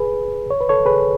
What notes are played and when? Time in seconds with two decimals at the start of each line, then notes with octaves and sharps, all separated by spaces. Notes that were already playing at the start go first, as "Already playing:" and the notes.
Already playing: G#4 B4
0.51 C#5
0.61 B4
0.69 A4 C#5
0.85 G#4 B4